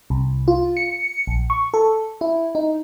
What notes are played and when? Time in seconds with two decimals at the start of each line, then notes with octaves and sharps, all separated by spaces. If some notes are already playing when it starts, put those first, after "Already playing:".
0.10 C2
0.48 F4
0.77 C#7
1.27 A#1
1.50 C#6
1.74 A4
2.21 E4
2.55 D#4